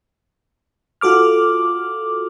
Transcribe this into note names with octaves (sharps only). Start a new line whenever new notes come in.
F4 F#4 A4 D6 F6